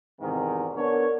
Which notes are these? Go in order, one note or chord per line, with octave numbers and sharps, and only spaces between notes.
E2 G#2 C3 D#3
B3 D4 A#4 C#5